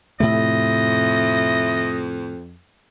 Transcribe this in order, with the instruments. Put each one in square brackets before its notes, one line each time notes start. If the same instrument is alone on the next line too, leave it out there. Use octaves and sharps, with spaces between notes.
[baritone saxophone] F2 [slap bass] A2 C3 A3 [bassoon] E4 [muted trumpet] D#5